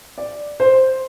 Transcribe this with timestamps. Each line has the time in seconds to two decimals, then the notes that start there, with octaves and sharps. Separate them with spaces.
0.18 D5
0.60 C5